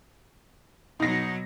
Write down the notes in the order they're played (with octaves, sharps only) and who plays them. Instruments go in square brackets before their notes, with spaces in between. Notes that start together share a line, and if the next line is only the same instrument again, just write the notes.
[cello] B2 F#3 [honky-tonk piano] D#4 A#6